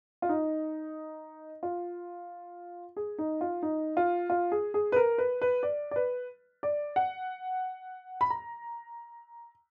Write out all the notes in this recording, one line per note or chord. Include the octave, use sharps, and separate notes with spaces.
F4
D#4
F4
G#4
D#4
F4
D#4
F4
F4
G#4
G#4
B4
A#4
B4
B4
D5
D5
B4
D5
F#5
B5
A#5